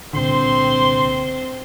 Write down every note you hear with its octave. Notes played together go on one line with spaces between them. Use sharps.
C2 A#2 D3 C4 C5 G5 C6